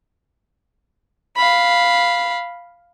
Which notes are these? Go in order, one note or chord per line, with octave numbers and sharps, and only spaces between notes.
F5 B5